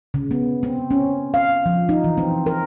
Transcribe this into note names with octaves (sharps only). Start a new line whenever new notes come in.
C#3
B3
C4
C#4
F5
F3
D#4
E3
C4
A#4